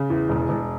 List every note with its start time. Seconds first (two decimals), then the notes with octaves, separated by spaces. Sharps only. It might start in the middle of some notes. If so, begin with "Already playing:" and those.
Already playing: C#3
0.10 E2
0.29 E1
0.49 E1